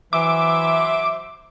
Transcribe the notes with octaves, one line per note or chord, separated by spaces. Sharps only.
E3 F#3 C5 E5 D6